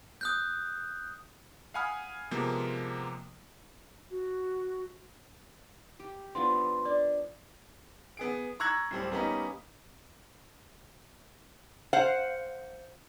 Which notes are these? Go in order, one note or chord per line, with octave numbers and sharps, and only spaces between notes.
D#6 F#6 G6
F5 F#5 G#5 B5 D#6 F6
C3 F3 G#3 A#3 B3
F#4
G4
F3 B3 D4 C6
D4 D5
B3 G#4 D7
A#5 C#6 E6 F#6 G#6 A#6
D1 G3 C4
G3 A#3 B3 C#4 D#4
C5 F5 F#5